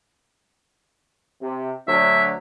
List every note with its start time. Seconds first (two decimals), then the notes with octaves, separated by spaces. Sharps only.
1.42 C3
1.88 D2 F#3 D4 E5